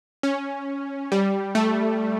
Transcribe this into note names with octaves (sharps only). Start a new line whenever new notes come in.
C#4
G3
A3